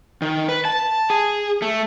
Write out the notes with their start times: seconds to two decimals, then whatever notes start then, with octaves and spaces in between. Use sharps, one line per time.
0.22 D#3
0.49 B4
0.65 A5
1.10 G#4
1.62 A3